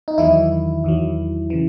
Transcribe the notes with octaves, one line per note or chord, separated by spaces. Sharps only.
D#4
E2 D#3 F#3 E4
E2 D#3 F#3
C#3 E3